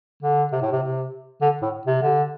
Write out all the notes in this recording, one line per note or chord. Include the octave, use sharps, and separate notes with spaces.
D3
C3
A2
C3
C3
D3
A2
C3
D3